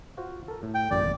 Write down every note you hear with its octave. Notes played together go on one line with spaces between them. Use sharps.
F4 F#4 C5
A4 A#4
A2
G5
A1 F#2 D5
G#1 F2 A#2